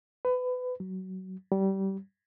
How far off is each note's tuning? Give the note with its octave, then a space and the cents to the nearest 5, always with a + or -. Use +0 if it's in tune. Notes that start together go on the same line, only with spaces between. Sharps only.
B4 +25
F#3 +20
G3 -25